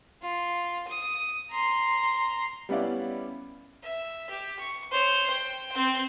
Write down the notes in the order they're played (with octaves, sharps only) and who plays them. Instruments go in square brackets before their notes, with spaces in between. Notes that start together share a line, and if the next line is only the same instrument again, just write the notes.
[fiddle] F4
D#6
A#5 C6
[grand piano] G3 B3 C#4 E4 D5 F5
[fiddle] E5
G4
C#6
C5 C#5
G5
C4 C5